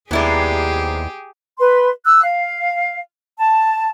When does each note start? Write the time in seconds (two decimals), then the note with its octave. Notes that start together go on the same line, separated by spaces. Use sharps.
0.11 D#2 C3 G#3 B3 E4 G4 G#4 D5
1.59 B4 C6
2.05 E6 F#6
2.24 F5
3.39 A5